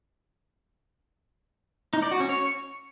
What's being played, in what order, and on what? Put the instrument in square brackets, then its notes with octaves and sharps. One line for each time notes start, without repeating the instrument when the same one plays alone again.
[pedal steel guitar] D#4
D5
F#4
C#4
C#5